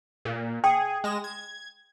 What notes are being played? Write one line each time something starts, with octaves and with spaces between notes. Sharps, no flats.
A#2
G#4 G5
G#3 A#6 E7
G#6